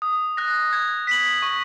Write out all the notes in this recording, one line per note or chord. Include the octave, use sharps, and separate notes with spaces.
D#6
F#6 A#6
G#6
B6 F#7
C#6